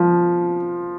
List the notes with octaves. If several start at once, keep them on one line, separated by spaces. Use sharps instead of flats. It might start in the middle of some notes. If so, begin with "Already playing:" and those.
Already playing: F3